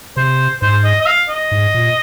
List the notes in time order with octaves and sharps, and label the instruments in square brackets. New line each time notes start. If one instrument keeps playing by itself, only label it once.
[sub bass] C3 [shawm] C5
[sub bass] G#2 [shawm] C5
[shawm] D#5
D#5
F5
D#5
[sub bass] G#2
A#2